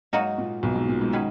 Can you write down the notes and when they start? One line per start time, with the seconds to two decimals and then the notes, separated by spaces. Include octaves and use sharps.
0.13 G#2 F#3 A#3 D#4 F#4
0.38 A#2
0.63 B1 B2
0.76 G#2
0.88 A#2
1.01 G#2
1.13 D#3 F#3 C#4 G#4 B4